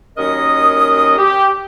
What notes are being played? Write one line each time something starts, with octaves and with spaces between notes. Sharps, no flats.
D#2 F#3 C#4 A#4 D#5 D#6
G4